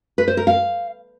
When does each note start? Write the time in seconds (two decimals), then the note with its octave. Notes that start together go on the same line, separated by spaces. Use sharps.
0.18 B4
0.28 C5
0.37 A#4
0.47 F5